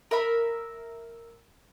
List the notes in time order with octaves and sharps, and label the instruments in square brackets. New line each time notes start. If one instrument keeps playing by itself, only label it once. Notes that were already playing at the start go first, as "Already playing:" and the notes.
[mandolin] A#4 E5 B5